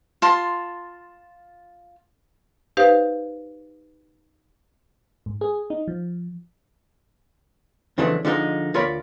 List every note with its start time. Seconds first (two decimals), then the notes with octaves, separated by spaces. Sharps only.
0.22 F4 A5 C6
2.77 D#4 G4 B4 C5 F5
5.26 G#2
5.41 G#4
5.70 D#4
5.88 F3
7.98 F2 C#3 E3 F#3 A3 D4
8.25 D3 F3 G#3 D#4
8.74 D2 F4 A#4 C#5 D5 B5